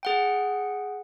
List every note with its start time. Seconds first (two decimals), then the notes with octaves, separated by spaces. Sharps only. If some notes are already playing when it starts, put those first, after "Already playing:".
0.03 G#4 F#5 G5